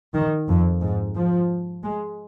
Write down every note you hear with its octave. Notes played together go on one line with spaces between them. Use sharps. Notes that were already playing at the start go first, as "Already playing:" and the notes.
D#3
F2
G#2
F3
G#3